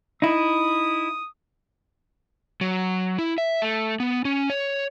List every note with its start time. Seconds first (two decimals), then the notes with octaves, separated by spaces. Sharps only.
0.22 D#4 E4 D#6
2.61 F#3
3.18 E4
3.38 E5
3.62 A3
4.00 B3
4.25 C#4
4.50 C#5